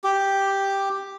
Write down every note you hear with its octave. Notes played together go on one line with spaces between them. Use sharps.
G4